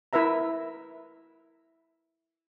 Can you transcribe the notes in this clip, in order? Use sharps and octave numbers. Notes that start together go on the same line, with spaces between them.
E4 A#4 B4 E5 A#5